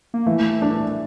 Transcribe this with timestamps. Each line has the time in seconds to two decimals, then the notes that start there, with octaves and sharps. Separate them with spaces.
0.14 A#3
0.26 E3 A3
0.62 D4